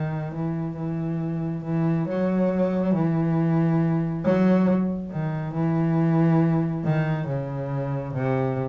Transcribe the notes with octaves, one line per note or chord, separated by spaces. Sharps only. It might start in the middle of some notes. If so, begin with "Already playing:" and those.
Already playing: D#3
E3
E3
E3
F#3
E3
F#3
D#3
E3
D#3
C#3
C3